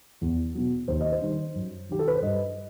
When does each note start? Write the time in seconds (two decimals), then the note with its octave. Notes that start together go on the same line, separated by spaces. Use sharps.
0.21 E2
0.54 B2 F#3
0.88 D#2 C5
1.01 D#5
1.12 C5
1.21 D#3 G3
1.55 F#2
1.89 D#3 F#3 G4
1.99 A4
2.08 B4
2.15 C5
2.22 G2 D#5